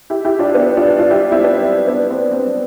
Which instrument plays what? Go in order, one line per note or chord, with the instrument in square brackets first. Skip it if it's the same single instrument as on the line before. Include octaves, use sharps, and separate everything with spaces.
[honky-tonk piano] E4 G4
E4 G4
D4 F4
B3 D4
D4 F4
D4 F4
E4 G4
C4 E4
B3 D4
C4
B3 D4
C4
C4